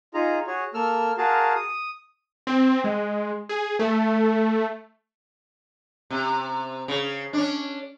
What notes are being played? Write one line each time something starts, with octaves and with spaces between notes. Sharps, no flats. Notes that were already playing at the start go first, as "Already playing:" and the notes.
D#4 F4 G#4 A#5
F#4 G#4 C#5
A#3 A4 E6 F6
F#4 G#4 A#4 F5 A5
D#6
C4
G#3
G#4
A3
C3
C#3
C#4 D4